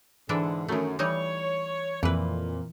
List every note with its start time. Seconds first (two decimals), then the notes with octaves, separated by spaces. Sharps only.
0.29 G#2 D3 E3 D4 E5
0.68 F#2 D#3 A3
0.99 E3 G3 D#4 C#5
2.03 F2 A#2 E3 B4